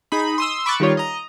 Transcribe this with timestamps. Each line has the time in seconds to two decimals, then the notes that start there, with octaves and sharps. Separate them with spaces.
0.12 D#4 G#4 B5
0.38 C6 D#6 E6
0.66 B5 C#6 D6 E6 F#6 A6
0.80 D#3 G3 D#4 F4 C#5
0.97 D#5 A#5